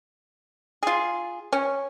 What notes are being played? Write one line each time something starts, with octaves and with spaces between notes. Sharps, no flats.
F4 G#4
C#4